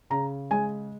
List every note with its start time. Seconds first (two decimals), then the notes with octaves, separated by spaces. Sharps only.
0.10 C#3 A#5
0.51 G#3 G#5